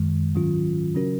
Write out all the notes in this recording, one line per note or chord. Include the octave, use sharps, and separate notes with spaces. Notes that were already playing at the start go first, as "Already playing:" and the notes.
Already playing: F#2 D#3 G#3
G#2 D#3 F#3 C#4 F4
C#3 F#3 C#4 F#4 A#4